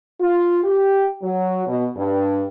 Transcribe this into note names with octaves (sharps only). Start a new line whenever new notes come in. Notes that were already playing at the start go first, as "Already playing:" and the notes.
F4
G4
F#3
B2
G2